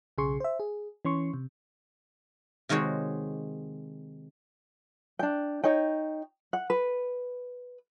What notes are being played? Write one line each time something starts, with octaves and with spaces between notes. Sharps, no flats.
B1 C#3 G#4 C6 C#6
C5 E5
G#4
E3 C#4 C6 C#6
C3
C3 D#3 G#3 F#4 C#5
D4 G5
D#4 C#5 G5
F#5
B4